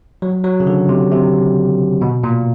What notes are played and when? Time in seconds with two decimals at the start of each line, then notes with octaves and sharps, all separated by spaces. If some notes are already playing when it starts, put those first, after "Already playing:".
0.22 F#3
0.44 F#3
0.60 C#3
0.67 D3
0.89 C3
1.12 C3
2.01 B2
2.24 A#2